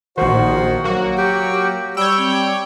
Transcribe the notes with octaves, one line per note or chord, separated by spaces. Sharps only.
A#1 D#3 F#4 C5
F#3 A#3 F#4
G4
G3 C#5 G5 E6
C4